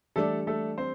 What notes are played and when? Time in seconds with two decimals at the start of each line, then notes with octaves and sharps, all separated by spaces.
0.16 E3 G3 A3 D4 G4 A4 D5
0.47 A3 A4
0.78 C4 C5